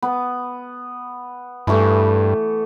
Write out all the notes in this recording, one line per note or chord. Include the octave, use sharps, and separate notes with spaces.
B3
G2 E3 A3